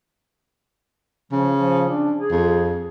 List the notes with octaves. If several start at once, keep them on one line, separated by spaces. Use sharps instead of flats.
C#3 F3
F3
D4
G#4
F2